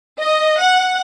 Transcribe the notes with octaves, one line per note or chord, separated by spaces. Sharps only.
D#5
F#5